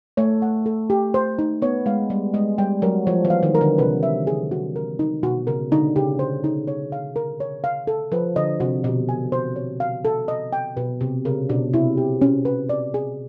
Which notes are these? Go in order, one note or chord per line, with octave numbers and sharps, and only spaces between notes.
A3 C#5
F#5
A4
G4
C5
D#4
B3 C#5
G#3 F5
G3 G#4
G#3 D#5
G3 G5
F#3 A#4
F3 C#5
E3
F5
D#3
A#4
D3
C3 B4
E5
G#4
F#4
A#4
D#4
B2 F#4
C#3 A#4
D3 D#4
C#3 G4
C5
D#4
C#5
F5
A#4
C#5
F5
A4
F3 B4
D3 D#5
C3 F#4
B2 D#5
G#5
C5
C#5
F5
A4
D#5
G5
B2 B4
C3 G4
C#3 A#4
B2 D4
C3 E4
G4
C#4
B4
D5
G#4